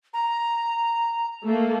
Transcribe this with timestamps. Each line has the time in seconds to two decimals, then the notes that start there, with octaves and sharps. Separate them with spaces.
0.14 A#5
1.46 A3 A#3